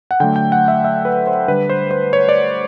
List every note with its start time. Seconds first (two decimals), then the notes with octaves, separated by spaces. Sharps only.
0.11 F#5
0.20 D3 F#3 A3 G5
0.36 G5
0.52 F#5
0.68 E5
0.84 E5
1.05 B4
1.27 C5
1.48 D3 G3 B4
1.70 C5
1.91 C5
2.13 C#5
2.29 D5